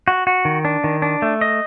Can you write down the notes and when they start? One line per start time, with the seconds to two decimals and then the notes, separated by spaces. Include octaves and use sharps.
0.08 F#4
0.27 F#4
0.45 D#3
0.65 D4
0.84 D#3
1.02 D4
1.22 A3
1.41 D#5